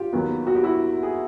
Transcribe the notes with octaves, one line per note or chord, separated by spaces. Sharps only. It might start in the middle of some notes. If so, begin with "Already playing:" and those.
Already playing: F4 G4
D#2 D#3 F#3 B3
F#4
G4
E4 F#4
G#4